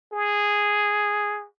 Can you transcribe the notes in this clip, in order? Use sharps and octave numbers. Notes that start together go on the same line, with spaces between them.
G#4